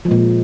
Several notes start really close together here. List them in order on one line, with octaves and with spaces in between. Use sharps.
F3 G#3 A#2